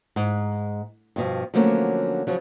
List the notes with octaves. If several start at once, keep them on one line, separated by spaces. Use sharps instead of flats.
G#2
G2 B2 F3
D3 F3 F#3 A3 A#3 C#4
C#3 F3 F#3